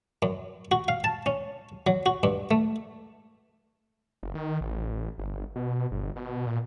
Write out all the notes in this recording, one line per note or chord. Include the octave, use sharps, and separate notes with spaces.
F#2
F#4
F5
A5
C#4
F#3
F#4
G2
A3
F#1
D#3
A1
G1
B2
G1
B2
A#2